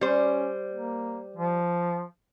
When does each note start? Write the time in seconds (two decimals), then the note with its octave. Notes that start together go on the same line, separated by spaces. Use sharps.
0.01 G3 C#4 C5
0.73 A#3
1.36 F3